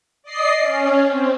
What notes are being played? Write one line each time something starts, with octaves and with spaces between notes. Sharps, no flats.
D5 D#5 C7
C#4
C4